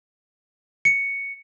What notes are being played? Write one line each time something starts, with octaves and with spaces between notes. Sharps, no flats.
C#7